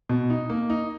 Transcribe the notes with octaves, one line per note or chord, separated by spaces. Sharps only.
B2
D#4
A#3
D#4